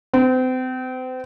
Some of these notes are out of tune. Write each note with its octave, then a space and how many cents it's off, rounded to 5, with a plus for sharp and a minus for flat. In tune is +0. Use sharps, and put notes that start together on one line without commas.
C4 -35